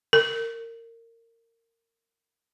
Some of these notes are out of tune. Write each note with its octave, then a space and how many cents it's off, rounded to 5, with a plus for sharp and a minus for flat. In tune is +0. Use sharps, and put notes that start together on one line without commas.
A#4 -25